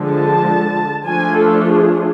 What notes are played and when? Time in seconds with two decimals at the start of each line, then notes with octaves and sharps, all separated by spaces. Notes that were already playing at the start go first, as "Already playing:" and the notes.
Already playing: D3 F3 G#3
0.08 A5
1.05 F3 A3 D4 F4 G#5
1.38 A4
1.70 G#4